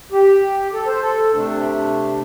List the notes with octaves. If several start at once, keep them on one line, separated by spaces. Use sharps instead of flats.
G4
A4
C5
A4
C3 A3 D4